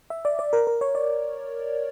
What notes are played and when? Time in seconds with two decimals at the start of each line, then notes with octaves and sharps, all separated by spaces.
0.10 E5
0.25 D5
0.39 D5
0.53 A#4
0.67 A#4
0.81 C#5
0.95 D5